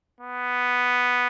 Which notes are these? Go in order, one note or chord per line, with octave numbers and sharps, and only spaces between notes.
B3